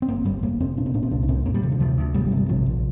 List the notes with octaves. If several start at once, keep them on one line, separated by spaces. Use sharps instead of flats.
C4
G1 A#3
G1 G3
F1 A#3
F1 C4
A#2 D4
C4
A#2 D4
C4
C2 D4
D4
A#2 C4
F2 A#3
G3
C3 F3
D3
D2 F3
D2
G1 G3
G3
C3
G3
A#1 F3
A#1